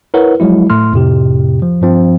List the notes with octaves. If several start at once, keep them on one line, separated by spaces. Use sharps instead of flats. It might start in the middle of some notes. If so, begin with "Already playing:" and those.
E4 A#4 B4 C#5 F#5
F3 F#3 G#3 E4
A2 A3 C6 F6
F2 A2 C3 G4
F3
G2 F3 C4